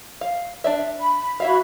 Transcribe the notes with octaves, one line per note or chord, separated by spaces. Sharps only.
F5
D4 D5 E5
B5
E4 F#4 E5 F5 B5